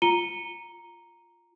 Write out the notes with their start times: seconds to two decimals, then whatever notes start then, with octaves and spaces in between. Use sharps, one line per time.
0.02 F4 A#5 C#7 D#7 G7